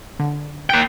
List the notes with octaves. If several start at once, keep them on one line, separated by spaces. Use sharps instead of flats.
D3
A#3 G5